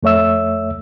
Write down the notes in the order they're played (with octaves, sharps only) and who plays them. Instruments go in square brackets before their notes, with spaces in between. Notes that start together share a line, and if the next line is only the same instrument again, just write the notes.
[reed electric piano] F2 A3 C#5 E5 E6